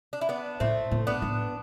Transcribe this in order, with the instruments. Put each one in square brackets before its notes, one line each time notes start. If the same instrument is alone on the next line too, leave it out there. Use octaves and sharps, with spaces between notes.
[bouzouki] D4
E4
B3 D4
[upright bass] A2 [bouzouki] A3 C4
[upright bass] A2
[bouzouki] B3 D4
[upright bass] A2